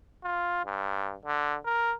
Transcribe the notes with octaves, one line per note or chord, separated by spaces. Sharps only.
F4
G2
D3
A#4